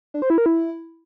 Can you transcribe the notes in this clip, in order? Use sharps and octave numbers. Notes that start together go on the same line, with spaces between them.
D4
C5
E4
A#4
E4